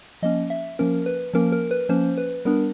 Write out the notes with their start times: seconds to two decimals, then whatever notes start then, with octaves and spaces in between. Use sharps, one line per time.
0.22 F3 A#3 C#4 D#5
0.50 E5
0.79 F3 A#3 C#4 A#4
1.06 B4
1.33 F3 A#3 C#4 A#4
1.52 A#4
1.71 B4
1.89 F3 A#3 C#4 C5
2.18 B4
2.45 G3 B3 D4 A#4